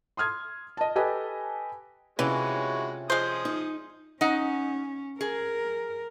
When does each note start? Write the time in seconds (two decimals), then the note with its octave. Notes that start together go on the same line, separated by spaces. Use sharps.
0.17 C6 D#6 F6 G#6
0.77 D#5 A5
0.96 G4 A4 B4 D#5 G#5 A5
2.19 C3 E3 G#3 C#4 F4 F#4 C#5
3.10 F3 G#3 G#4 C5 D#6
3.45 D#4
4.21 C#4 D#4 F#5
5.21 G#4 A#4